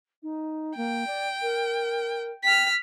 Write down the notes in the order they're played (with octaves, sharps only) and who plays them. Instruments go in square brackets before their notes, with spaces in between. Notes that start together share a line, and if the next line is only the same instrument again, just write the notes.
[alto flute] D#4
[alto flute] A#3 [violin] G5
[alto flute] D5
A#4
[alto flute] G5 [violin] F6 B6